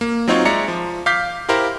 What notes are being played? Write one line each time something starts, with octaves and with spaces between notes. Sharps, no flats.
A#3
F#3 C4 D#4 F4 C#5
G#3 D5 E5 A#5 C#7
F3
F5 D6 G6 B6
E4 G4 A#4 C5 F5